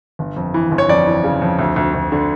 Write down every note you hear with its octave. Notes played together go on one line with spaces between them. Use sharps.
G1
F2
E3
G1
C#5
F2 D5
E3
C#3
F2
D2
D2
D2
D3